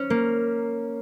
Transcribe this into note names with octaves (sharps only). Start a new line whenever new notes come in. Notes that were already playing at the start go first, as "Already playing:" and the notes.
Already playing: C#4
A#3